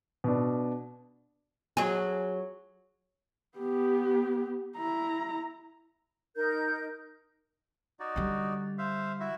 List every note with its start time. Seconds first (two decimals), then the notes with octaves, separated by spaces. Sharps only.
0.24 B2 D4
1.77 F#3 G#4
3.58 B3 G4
4.78 E4 A#5
6.36 D#4 A#4 G6
8.00 D#4 F#4 D5
8.16 D3 G3
8.78 C5 E5 F5
9.20 E4 F#4 E5